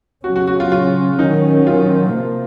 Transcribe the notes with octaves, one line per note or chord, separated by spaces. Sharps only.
C#3 F#3 C#4 F#4
F#4
F#4
F4
F4
D#3 F#3 C#4 D#4
F4
C3 F3 A#3